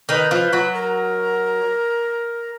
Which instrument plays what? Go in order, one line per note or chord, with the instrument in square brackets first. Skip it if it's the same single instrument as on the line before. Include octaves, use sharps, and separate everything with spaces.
[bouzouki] D#3 D#4 [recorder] B4
[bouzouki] F3 F4
F#3 F#4
[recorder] A#4